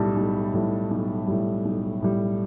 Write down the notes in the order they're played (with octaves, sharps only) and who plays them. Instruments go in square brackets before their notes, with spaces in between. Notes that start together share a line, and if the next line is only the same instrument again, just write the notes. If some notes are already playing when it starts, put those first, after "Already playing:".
Already playing: [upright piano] B1 A2 G3 A5
B1
A2 G3
B1
A2 G3
B1
A2 G3